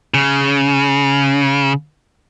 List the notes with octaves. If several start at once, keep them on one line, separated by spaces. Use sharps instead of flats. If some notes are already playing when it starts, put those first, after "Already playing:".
C#3